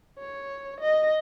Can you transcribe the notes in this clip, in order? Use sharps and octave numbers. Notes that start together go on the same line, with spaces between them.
C#5
D#5